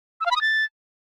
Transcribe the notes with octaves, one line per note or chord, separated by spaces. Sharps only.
E6
F5
B5
D#6
A6